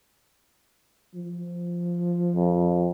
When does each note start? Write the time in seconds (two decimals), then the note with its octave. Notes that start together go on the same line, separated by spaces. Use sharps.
1.15 F3
2.36 F2